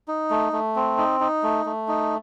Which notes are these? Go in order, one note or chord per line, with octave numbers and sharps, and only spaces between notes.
D#4
A3
A3
C4
D#4
D#4
A3
A3
D#4